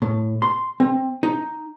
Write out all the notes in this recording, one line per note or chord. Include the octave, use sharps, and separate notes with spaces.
A2
C6
C4
D#4